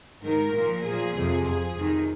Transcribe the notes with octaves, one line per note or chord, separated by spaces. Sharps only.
G#2 D#3 A#4
A#2 F3
A#2 F3 G#4
F2 C3 F3
F2 F3 G#4
F2 C3 D#3